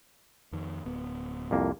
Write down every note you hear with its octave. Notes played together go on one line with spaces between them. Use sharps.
F2 D#3
D1 B3
C2 F2 A#3